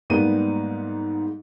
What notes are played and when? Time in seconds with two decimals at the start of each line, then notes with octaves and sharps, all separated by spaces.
0.10 G#2 G3 A#3 B3 D#7